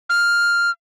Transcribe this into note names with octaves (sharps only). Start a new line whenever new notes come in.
F6